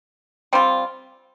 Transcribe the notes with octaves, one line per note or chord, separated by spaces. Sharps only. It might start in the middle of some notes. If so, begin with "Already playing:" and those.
G3 C4 F4